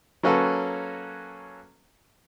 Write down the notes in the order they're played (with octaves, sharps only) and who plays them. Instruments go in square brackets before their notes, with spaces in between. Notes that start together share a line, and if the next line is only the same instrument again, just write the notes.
[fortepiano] F#3 A#3 C#4 F#4 A4 B4